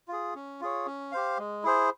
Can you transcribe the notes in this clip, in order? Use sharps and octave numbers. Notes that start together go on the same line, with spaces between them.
F4 G#4
C#4
F4 G#4 C#5
C#4
G4 C5 F5
G#3
E4 G#4 C5